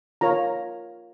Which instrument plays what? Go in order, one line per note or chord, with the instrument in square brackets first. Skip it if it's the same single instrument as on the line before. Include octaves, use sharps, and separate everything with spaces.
[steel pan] F4 A#4 C#5 A#5